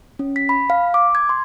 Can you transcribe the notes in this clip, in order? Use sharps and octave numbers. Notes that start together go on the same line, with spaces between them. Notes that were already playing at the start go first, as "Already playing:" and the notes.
C#4
B6
B5
F5
D6
G#6
C6